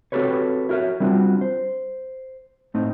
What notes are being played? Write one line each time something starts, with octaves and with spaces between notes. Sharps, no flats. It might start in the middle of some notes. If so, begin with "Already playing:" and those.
C4 F#4 G4 A4 B4 C#5
E4 F#4 A#4 C#5 E5
G3 C4 D4 F4 F#4
C5
A2 A3 C4 D#4